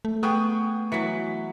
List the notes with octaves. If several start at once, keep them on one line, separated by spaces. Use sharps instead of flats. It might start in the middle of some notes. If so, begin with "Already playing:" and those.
A3
B3 G#4 G5 C#6 D#6
E3 F#3 B6 C#7